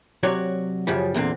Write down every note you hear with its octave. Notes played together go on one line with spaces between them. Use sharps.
C3 F#3 F#4 C#5 D5
F#2 C#3 F3 G3
E2 A#2 D3 C4